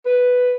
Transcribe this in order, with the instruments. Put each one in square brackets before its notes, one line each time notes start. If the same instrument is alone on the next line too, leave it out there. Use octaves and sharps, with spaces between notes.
[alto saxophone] B4